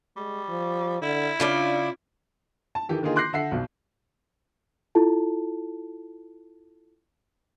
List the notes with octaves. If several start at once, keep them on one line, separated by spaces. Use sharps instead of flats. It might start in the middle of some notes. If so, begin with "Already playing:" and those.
G3 G#3
F3
D3 E4
C#3 D4 F4 D5
A5
D#3 E3 G4 A4
D3 D#3 A#3 D#4 F4 G#4
C6 D6 F#6 G6 A#6 C7
D3 A4 E5 F#5 C7
B1 B2
E4 F4 A4 A5